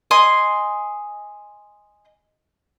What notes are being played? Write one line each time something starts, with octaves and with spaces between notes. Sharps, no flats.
D#5 G#5 C6